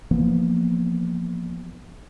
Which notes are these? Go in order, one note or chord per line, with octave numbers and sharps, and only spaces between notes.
E3 F3 A#3 B3